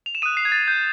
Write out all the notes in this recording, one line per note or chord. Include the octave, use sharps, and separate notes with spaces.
F7
E7
D#6 F#6 D#7
C7
G#6
A6
G6